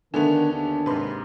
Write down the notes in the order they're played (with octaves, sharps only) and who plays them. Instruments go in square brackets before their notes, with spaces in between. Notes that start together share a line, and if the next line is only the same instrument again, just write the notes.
[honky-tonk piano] D3 A3 F7 [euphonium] D#3 [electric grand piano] B3 G#5 [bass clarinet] D4
[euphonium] D#2 [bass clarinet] D4
[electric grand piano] G#2 C3 [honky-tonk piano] B4 C6